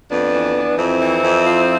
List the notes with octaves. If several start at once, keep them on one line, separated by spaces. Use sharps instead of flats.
F2 B3 D4
E3
E3
F2 C4 E4
E3
F2
F3